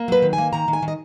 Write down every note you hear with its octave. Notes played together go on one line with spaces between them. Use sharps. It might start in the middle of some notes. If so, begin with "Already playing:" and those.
Already playing: A#3
F#3 B4
D#3
G#5
A#3
D#3 A#5
D#3
G#5
D#3
D#5